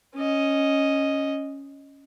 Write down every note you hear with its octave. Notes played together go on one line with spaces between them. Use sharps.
C#4 D#5